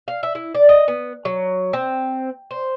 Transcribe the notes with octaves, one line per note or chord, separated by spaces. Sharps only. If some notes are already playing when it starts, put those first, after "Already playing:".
F5
E5
E4
D5
D#5
B3
F#3
C4
C5